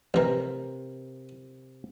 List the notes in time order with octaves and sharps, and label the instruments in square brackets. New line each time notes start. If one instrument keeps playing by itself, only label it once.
[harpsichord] A1 E3 [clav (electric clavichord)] C3 A#4